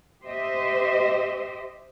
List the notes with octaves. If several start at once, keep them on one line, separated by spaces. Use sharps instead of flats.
G4 C5 D#5 E5